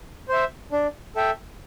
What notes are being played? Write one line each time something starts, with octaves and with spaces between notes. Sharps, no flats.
C5 E5
D4
A4 E5 G5